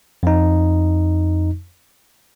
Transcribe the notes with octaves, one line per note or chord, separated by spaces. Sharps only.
F2 D#4